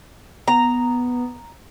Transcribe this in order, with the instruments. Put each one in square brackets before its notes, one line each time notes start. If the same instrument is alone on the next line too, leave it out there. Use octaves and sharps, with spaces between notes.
[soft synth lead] B3 [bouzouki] A#5